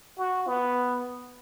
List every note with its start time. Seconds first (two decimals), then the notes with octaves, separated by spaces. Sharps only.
0.18 F#4
0.48 B3